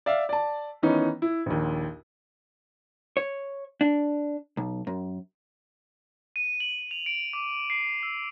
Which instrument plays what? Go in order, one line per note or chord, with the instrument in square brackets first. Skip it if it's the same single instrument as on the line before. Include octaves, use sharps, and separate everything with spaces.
[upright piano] D5 E5 F5
D5 A5
D#3 E3 B3 C#4 D#4
E4
A#1 D#2
[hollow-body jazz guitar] C#5
D4
B1
F#2
[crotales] D#7
F#7
F7
D7
D6
C7
E6